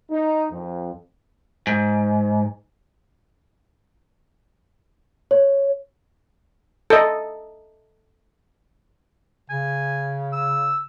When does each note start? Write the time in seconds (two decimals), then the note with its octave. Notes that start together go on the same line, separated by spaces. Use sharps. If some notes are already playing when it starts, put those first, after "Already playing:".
0.11 D#4
0.51 F2
1.67 G#2
5.31 C#5
6.90 A4 D#5
9.50 C#3 G#5
10.32 E6